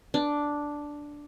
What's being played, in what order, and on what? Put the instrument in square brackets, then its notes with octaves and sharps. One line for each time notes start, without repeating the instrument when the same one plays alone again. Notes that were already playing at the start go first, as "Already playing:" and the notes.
[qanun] D4